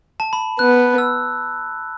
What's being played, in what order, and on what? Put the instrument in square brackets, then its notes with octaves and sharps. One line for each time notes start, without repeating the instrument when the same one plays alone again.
[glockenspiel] A5
B5
[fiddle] B3 [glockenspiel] F#6
[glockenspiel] E6